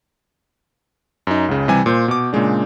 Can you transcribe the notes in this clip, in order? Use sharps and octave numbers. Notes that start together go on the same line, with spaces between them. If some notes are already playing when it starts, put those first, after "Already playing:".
F#2 D#4
C#2 C#3
C3 E3 G3 G#5
A#2 C5 G6
B2 D6
A#2 C#3 G#3 D4